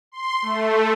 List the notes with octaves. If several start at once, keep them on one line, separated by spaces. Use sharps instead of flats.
C6
A3